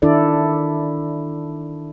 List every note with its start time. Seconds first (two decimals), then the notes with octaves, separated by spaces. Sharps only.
0.02 D#3 D4 E4 A4 D5